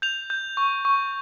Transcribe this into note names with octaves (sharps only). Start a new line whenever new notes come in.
G6 F7
G6
C#6
C#6